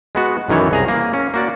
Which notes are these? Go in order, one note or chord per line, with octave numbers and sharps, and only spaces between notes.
G#3 B3 F#4
B1 F#2 D#3 E3 C#5
C2 G#4 A#5
A#3
C#4
A#3 F#4 D5